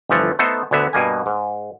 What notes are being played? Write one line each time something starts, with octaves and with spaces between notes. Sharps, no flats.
G1 E3 F3 A3
A3 B3 D#4 A4 C5
D2 D3 B3 E5
G2 B2 A#3 G#5
G#2